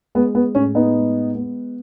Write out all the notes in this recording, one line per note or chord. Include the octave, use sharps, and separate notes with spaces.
G#3 B3
B3
A2 C#4
B3 D#4
G#3
B3